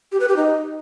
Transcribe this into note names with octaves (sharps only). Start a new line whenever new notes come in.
G4
B4
G4
D#4